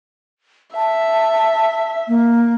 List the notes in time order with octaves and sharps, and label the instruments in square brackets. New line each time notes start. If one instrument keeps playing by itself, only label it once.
[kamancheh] E5 [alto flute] A5
[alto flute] A#3